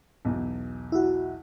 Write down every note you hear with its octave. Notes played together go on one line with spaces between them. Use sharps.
B1 E2
E4 F#4